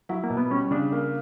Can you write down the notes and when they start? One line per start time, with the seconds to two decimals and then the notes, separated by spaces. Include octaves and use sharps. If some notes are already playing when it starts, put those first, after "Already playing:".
0.09 F#3 E4
0.24 A#3
0.30 B2
0.37 B3
0.51 G3 C#4
0.71 C#3 D4
0.92 A#3